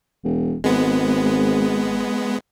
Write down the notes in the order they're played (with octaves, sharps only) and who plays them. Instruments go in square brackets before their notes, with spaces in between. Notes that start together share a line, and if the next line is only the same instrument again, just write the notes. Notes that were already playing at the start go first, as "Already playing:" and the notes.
[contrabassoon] E1
[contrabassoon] G#1 [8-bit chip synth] G#3 B3